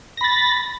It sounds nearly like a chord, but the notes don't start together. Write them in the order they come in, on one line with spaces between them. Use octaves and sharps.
A#6 B5 A6